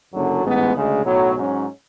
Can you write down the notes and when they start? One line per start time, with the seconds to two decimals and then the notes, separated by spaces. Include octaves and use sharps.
0.13 F#1 F#2 D3 F#3
0.44 A1 G#2 G#3 B3
0.74 D2 C#3 G#3
1.05 B1 A2 F#3
1.36 G#2 F#3 C#4